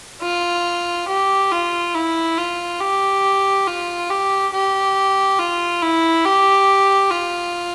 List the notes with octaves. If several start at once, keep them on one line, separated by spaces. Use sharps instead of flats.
F4
G4
F4
E4
F4
G4
F4
G4
G4
F4
E4
G4
F4